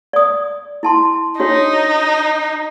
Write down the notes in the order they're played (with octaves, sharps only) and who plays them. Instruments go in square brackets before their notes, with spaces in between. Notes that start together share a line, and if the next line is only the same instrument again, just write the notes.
[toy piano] D5 D#6
E4 A5 C6
[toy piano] D4 F#4 C#5 [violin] D#4